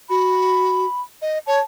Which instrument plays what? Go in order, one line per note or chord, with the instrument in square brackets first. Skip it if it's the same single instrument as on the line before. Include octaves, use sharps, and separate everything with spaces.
[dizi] F#4 [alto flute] B5
[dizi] D#5
[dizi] C#5 [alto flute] A5